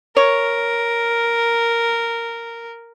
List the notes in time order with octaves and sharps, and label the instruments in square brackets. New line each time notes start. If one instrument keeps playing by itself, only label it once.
[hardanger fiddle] A#4 [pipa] C#5